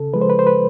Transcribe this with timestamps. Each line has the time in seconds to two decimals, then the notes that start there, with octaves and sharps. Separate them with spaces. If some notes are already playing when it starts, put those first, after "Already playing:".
Already playing: C#3 A4
0.14 F3 G#3 B4
0.21 C5
0.30 B4
0.39 C5
0.47 B4